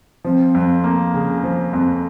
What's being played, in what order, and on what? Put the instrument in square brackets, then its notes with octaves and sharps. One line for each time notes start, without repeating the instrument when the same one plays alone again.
[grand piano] F3 [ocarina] C4
[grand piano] F2
A#3
C#3
F3
F2